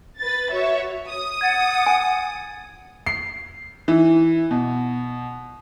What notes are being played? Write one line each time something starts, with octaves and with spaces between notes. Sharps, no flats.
B4 A6
F#4 C#5 E5
D#6
F#5 G#6 A6
G#5
C7
E3
B2